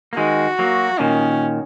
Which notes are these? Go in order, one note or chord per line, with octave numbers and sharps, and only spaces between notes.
A#3
D#3 G#3 F#4
F#3 A#3
A#2 D#3 C#4